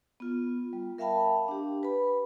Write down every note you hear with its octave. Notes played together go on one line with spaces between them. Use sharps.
B3 F4
G3
A#4 E5 F5 G5 A5 B5
D4 G4
B4 B5